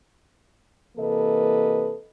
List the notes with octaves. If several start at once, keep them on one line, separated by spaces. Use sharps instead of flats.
C3 E3 A#3 A4 B4 D#5